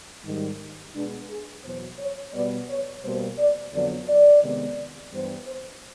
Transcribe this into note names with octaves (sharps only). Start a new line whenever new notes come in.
G#2 D#3 G3
B2 G#3 B3 D4
G#4
E2 B2 F#3 C5
C#5
B2 G3 B3 D5
C#5
B2 G3 A#3 C5
D5
F2 D3 F#3 B3 D5
D5
C3 D#3 G#3 B3
G2 E3 G3 B3 C5
C5